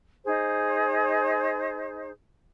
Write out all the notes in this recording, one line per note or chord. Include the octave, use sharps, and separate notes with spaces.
D#4 G#4 C5